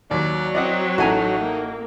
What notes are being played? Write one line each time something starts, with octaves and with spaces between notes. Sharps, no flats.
D#2 F#3 D5
C4 D5 D#5 F#5
A1 D#4 F#4 A4 G#5 A#5
A#3